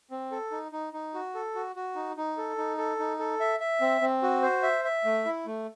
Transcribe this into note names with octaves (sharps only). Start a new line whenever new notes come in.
C4
A4
D#4
D#4
D#4
F#4
A4
F#4
F#4
D#4
D#4
A4
D#4
A4
D#4
A4
E5
E5
C4
C4
F#4
C5
E5
E5
A3
E4
A3